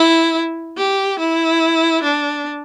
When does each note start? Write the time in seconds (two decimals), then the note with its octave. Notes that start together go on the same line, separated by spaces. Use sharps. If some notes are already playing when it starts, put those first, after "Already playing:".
Already playing: E4
0.77 G4
1.19 E4
2.03 D4